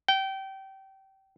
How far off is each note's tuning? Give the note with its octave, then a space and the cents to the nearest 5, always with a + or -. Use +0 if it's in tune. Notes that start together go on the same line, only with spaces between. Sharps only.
G5 -25